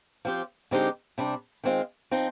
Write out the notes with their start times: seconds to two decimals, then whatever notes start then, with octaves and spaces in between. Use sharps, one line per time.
0.25 F3 C4 G4
0.71 D3 G#3 C4 D#4 G4
1.18 C3 G3 D4
1.64 D#3 G#3 C4 F4
2.11 F3 C4 D#4